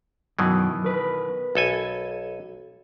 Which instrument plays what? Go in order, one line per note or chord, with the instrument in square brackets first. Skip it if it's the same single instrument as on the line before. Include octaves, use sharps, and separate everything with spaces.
[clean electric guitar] F#2 F#3 [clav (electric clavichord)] B2 D#3 E3
[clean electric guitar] A#4 B4
[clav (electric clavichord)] B1 A4 G#5